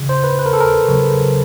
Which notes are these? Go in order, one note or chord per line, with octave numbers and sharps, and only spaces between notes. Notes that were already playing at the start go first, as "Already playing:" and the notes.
Already playing: C#3 E3
C5
B4
B4
A#4
A4
A#4
C#3 F#3 B3